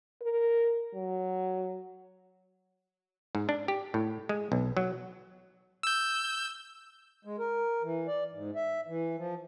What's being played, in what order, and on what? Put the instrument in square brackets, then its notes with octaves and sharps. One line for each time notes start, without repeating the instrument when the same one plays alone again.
[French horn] A#4
F#3
[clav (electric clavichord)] G#2
D4
G4
A2
G#3
B1
F#3
[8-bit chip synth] E6 G6
[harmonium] G#3
A#4
E3
D5
G#2
E5
E3
F3